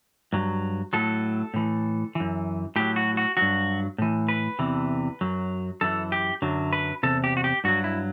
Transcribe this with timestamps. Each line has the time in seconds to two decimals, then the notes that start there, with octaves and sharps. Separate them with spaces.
0.33 G2 F#3
0.93 A2 F#3 A4
1.54 A2 E3
2.15 F#2 E3
2.76 A2 F#3 G4
2.96 F#4
3.17 F#4
3.37 G2 F#3 F#4
3.98 A2 E3
4.28 B4
4.59 E2 C3 E3
5.21 F#2 F#3
5.81 F#2 E3 A4
6.12 G4
6.42 F#2 D3 F#3
6.73 B4
7.03 E2 C3 A4
7.24 G4
7.37 F#4
7.44 G4
7.64 G2 F#3 F#4
7.84 E4